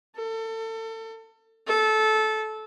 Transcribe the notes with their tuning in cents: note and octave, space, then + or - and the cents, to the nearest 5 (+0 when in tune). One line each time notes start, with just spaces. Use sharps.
A4 +30
A4 -20